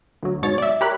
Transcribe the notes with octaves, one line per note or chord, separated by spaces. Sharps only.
D2 F#3
G#2 B2 C#5 A6
D5 E5
G4 A#4 C#5 B5 F#6